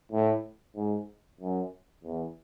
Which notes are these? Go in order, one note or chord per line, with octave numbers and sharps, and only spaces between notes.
A2
G#2
F#2
E2